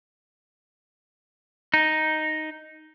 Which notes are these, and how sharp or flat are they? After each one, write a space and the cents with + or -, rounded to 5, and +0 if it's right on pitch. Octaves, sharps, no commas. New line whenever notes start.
D#4 +0